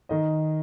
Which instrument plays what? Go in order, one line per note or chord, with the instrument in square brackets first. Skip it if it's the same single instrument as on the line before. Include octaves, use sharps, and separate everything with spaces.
[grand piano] D#3 D#5